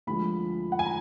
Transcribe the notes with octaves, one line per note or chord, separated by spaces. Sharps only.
D2 D3 F3 G#3 B5
F#5
G#5
A#5